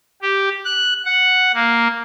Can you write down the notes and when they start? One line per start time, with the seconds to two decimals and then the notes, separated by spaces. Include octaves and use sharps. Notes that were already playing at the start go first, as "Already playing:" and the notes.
0.22 G4
0.65 F#6
1.05 F#5
1.54 A#3